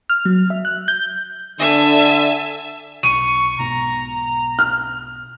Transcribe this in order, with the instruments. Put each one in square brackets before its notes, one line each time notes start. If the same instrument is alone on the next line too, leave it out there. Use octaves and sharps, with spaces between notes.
[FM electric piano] F6
F#3
E5
F#6
G6
[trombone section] D3 [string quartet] E5 G#5 A5
[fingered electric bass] B1 [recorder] C#6 [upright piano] D#7
[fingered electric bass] B1 G#2 B2 [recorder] A#5
[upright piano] F6